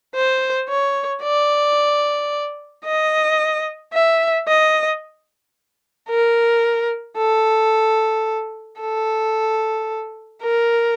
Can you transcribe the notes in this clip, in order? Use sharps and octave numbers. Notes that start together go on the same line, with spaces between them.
C5
C#5
D5
D#5
E5
D#5
A#4
A4
A4
A#4